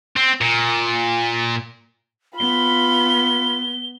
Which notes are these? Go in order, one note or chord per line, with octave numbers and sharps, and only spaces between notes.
C4
A#2
B3 F4 B5 G7